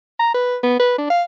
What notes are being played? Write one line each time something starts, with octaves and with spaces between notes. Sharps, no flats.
A#5
B4
B3
B4
D4
F5